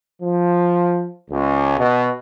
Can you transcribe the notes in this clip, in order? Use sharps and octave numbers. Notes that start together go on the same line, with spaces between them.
F3
C#2
B2